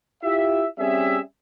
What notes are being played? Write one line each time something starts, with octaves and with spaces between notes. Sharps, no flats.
E4 F4 G4 E5
G3 C4 C#4 G#4 E5